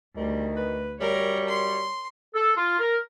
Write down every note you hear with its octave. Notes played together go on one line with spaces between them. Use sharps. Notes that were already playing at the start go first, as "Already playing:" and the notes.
D2 D#3 G3
B4
F#2 G3 A#4 C#5
C6
A4
F4
A#4